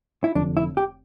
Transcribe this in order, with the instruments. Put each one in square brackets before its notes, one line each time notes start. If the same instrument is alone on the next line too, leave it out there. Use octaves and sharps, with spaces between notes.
[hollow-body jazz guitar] E4
[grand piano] F1 F2 D3 [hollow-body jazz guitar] D4
[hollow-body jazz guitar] E4
G4